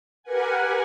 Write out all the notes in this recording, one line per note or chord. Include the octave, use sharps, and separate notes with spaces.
G4 A#4 B4 F#5 G#5